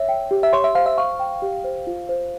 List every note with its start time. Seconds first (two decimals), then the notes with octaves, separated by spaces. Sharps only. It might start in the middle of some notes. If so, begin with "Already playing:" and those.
Already playing: C#5 E5
0.08 G5
0.31 G4
0.43 E5
0.53 C#5 C6
0.64 E5
0.75 C5 F5
0.86 E5
0.98 F5 C#6
1.19 G5
1.42 G4
1.64 C5
1.87 F4
2.09 C5